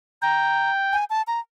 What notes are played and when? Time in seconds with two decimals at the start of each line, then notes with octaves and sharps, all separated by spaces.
0.22 G5 A#5
0.92 G#5
1.10 A5
1.27 A#5